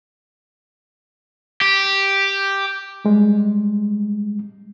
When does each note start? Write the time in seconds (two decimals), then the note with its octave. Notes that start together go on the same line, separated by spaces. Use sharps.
1.61 G4
3.05 G3 G#3